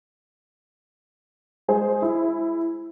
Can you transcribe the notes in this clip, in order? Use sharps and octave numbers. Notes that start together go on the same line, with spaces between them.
G#3 G#4 C5
E4